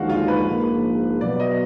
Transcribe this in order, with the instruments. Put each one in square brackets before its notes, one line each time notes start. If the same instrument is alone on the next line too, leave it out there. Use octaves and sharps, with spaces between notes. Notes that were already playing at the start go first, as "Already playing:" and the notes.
Already playing: [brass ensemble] D#2 D3 F3 G#3 D#4 [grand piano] F#4 F5
[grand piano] F4
B4
[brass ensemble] A#1 G#2 F3 A#3
[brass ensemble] B2 F#3 B3 [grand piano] D5
[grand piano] D#5